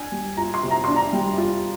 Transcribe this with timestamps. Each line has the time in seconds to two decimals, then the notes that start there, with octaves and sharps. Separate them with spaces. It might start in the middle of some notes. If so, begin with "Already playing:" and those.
Already playing: D4 G#5
0.12 G3
0.37 F4 A#5
0.54 C6
0.63 C3
0.71 A#5
0.84 D4 C6
0.96 A#5
1.13 G3
1.38 F4